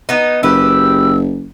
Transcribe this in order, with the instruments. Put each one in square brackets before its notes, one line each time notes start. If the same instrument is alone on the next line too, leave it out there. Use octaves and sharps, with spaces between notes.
[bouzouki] B3 D#4
[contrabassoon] F#1 [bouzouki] G4 B4 [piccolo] E6